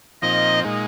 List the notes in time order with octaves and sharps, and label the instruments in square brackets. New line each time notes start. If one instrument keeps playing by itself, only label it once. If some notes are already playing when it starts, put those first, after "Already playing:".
[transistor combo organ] A#2 F3 C4 D#4 [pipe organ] D#5
[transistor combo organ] A#2 G#3 D#4